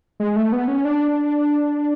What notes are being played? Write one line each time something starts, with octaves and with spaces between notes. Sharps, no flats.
G#3
A3
B3
C#4
D4